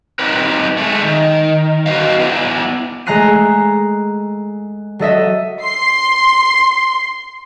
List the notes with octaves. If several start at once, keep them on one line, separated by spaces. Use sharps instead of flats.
C4 D4 D#4 G4 A#4 B4
G#3 A3
D#3
F#4 B4 C5 D#5 F5
B3 D4 E4
G#3 A3 A#5 F#6 C7 D#7
F#3 A4 D#5 E5
C6 C7